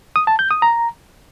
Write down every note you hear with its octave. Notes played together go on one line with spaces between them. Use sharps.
D#6
A5
G6
D#6
A#5